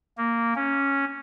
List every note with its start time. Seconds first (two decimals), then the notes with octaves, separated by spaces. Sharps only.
0.18 A#3
0.56 C#4